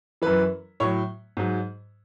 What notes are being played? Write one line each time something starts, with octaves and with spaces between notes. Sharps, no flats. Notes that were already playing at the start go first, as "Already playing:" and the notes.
F#2 E3 B4
A2 F#3 C#5
G#2 F#3